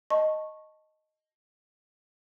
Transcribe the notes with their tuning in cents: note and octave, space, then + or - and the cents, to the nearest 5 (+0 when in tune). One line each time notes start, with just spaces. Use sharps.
D#5 +0 A5 +0 C#6 -15